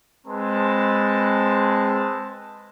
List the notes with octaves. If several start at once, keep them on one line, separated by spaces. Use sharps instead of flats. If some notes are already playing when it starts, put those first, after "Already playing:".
G#3 C4 B4 A5 C6